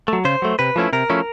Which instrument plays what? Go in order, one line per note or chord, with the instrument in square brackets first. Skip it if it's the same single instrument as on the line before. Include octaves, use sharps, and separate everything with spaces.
[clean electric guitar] F#3 A3
C#3 C5
F#3 A3
C3 B4
F3 A3 C#4 E4
C3 A#4
F3 A3 C#4 E4